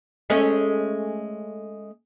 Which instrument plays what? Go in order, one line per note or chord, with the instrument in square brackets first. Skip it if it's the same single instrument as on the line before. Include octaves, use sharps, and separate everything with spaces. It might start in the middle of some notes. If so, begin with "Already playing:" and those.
[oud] G#3 A3 C#4